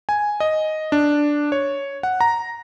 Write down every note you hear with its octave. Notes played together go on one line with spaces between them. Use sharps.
G#5
D#5
D4
C#5
F#5
A#5